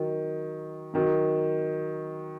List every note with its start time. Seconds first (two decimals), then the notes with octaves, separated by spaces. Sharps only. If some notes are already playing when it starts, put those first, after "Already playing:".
Already playing: D#3 F#3
0.94 D#3 F#3